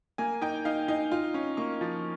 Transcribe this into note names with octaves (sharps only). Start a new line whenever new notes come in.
A#3 G#5
D#4 G5
D#4 F5
D#4
F4
C#4
A#3 C#6
F3